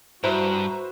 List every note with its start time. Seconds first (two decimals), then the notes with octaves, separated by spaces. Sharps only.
0.24 G2 E4 F#4 B4 C5 A#5